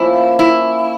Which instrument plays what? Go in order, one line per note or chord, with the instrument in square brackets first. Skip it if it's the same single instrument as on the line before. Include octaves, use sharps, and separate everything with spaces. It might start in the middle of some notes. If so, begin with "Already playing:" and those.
Already playing: [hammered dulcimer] F3 A#3 C#4 [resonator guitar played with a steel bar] E4
[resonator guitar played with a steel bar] E4